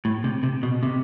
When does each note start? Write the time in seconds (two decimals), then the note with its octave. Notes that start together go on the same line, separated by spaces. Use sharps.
0.05 A2
0.24 C3
0.43 C3
0.63 B2
0.83 C3